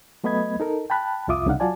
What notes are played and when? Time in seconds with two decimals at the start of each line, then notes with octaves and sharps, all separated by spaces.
0.24 F#3 A3 B3 D#5 B5 G#6
0.60 D#4 A4 A#4
0.90 G5 A5 B5 F#6
1.28 C2 F2 F4 E5 D6 D#6
1.46 C2 C#3 D4 D#4 F5 F#5
1.60 F#3 F4 F#4 D5 G#5 A5